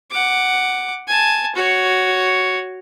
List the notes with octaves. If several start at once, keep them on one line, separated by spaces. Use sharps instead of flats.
F#5 D6
G#5 A5
F#4 C#5